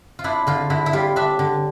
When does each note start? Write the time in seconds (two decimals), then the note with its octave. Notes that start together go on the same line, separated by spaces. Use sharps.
0.19 F4
0.24 D4 E4
0.47 D3 F4
0.70 D3 E4
0.86 E4
0.93 G3 F4
1.16 D4 E5
1.39 D3